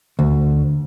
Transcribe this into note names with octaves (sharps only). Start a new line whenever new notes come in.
D2